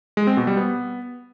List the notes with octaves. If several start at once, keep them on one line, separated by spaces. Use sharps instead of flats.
G#3
C4
B2
G3
B3